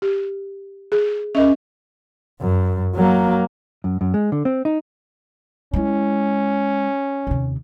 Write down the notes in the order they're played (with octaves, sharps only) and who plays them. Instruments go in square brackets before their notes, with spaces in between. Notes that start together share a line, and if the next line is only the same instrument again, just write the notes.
[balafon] G4
G#4
[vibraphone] C#4 [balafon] A#4 D#5 E5
[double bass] F#2
F#3 A#3
[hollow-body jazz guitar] F#2
F#2
G#3
D3
C4
D#4
[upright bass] G#3 E4 [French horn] C#4
[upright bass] D#2 C3